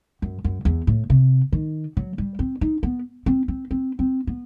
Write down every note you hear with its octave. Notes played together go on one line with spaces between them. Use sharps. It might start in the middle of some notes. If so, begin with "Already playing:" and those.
F#2
F#2
E2
A2
C3
D#3
F#3
G3
C4
D#4
B3
C4
C4
C4
C4
B3